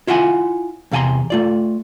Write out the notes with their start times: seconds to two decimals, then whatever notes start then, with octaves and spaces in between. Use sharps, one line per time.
0.07 E4 F4 E5 F#5 G#5
0.91 E2 C3 F5 G#5 A#5 C6
1.30 A3 F4 D5